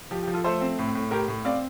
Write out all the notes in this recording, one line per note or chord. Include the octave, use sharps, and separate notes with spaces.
F3 G4
G4
F3
F4 A4
A3 A4 C5
C4
A2
A2
A2 G4 A#4
A2
C4 D5 F5